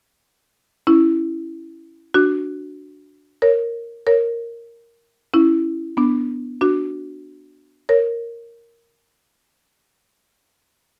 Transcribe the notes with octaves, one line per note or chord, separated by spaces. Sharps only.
C#4 E4
D4 F#4
A#4 C#5
A#4 C#5
C#4 E4
B3 D4
D4 F#4
A#4 C#5